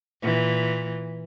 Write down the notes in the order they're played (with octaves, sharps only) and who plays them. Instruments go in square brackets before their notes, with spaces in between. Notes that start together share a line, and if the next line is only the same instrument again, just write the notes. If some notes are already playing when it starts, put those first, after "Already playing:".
[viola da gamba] A#2 E3